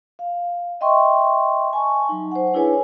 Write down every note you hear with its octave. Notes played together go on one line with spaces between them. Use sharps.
F5
D#5 E5 G5 C6 C#6
G#5 A5 C#6
F#3 D#4
C5 F#5
D4 E4 G#4 B4 C#5 G#5